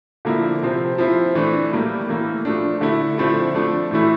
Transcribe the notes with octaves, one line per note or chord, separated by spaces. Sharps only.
D3 F3 A#3 E4
C3 F3 C4
F3 C4 E4
E3 A3 D4
A2 G3 A#3
A2 E3 A#3
F3 A3 D4
D3 A3 E4
D3 F3 A3 C4 E4
F3 A3 D4
A2 E3 A3 E4